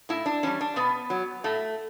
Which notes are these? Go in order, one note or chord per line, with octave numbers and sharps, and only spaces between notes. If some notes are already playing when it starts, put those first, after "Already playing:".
A2 E4
D4
E3 G3 C#4
D4
B2 B3
F#3
A2 A3